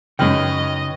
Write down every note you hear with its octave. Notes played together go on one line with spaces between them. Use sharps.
F#2 C#3 D#4 B4 D#5 G5 F6